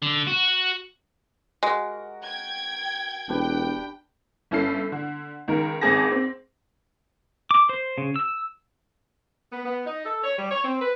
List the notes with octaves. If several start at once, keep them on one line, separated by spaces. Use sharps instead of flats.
D3
F#4
G#3 F#4 A#4
G5 G#6
E1 D4 G4 B4 G5
G1 C#4 E4 A4 C7
D3
C#2 D#3 A#4
G#1 C#2 C4 G#4 A5 A#6
C4
D6
C5
C#3
E6
B3
B3
D#4
A4
C#5
G3
C#5
C4
B4